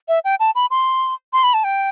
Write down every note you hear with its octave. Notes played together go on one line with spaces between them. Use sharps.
E5
G5
A5
B5
C6
C6
B5
A5
G5